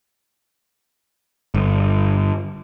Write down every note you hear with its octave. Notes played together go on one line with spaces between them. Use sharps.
G1